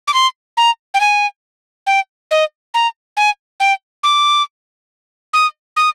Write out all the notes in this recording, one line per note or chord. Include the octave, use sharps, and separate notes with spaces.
D6
C6
A#5
G5
G#5
G5
D#5
A#5
G#5
G5
D6
D#6
D#6